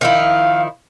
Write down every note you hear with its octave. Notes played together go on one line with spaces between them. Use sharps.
D#3 F3 E4 F5